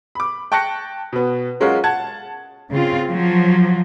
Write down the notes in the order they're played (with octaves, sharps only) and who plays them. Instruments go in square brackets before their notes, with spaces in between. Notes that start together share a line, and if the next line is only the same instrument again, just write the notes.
[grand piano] B5 D6
G5 A5 C#6 F#6 A#6 C#7
B2 B3
F#3 G#3 C#4 F4 F#4 A#4
F#5 A5 G#6
[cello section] C#3 C4 F4
F3 F#3